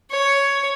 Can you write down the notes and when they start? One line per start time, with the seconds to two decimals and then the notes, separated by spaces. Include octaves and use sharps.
0.11 C#5